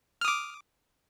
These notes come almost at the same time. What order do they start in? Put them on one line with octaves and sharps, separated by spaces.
F6 D#6 D6